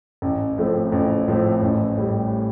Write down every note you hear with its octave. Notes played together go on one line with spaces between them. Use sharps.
A1
A2 F3 A3 C4
A1
A2 F3 A3 C4
A1
A2 G3